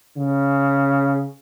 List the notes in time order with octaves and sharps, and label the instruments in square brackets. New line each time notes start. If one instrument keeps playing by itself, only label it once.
[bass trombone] C#3